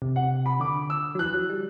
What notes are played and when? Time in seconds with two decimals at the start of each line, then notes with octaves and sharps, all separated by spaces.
0.02 C3
0.16 F#5
0.46 B5
0.60 D3 D6
0.90 E6
1.15 F#3
1.19 E3 F#6
1.34 F#3
1.50 G3